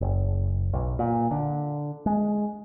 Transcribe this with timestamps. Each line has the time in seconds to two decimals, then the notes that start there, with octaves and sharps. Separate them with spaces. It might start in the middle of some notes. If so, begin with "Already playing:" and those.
0.01 F#1
0.73 B1
0.99 A#2
1.31 D3
2.06 G#3